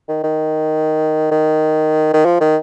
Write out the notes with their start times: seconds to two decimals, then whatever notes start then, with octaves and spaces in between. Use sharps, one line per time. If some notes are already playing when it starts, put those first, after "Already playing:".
0.08 D#3
0.24 D#3
1.31 D#3
2.13 D#3
2.25 F3
2.40 D#3